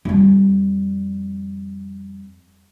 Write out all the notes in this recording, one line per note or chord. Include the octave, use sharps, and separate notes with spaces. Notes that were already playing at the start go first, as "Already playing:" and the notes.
F2 G3